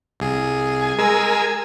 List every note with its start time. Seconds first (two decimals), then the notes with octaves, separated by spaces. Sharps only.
0.20 C2 G#4
0.81 G#5
0.99 G#3 G#4 A#4 G#5 E6